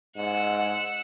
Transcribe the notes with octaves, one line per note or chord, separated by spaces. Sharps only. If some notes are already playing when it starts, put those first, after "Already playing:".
G#2 F#5 E6